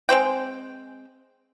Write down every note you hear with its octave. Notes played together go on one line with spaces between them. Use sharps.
G#3 C4 C5 G5